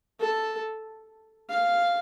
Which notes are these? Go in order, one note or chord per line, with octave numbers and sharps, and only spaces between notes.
A4
F5